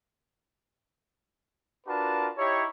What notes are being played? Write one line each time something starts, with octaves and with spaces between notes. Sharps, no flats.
D4 F4 F#4 A#4 B4 A5
D#4 E4 G4 C#5